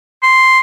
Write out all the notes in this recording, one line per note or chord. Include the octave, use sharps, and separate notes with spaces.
C6